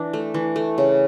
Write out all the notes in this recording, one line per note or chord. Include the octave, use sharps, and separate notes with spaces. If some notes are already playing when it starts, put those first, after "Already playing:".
Already playing: E3 D4
A3
E3
A3
C#3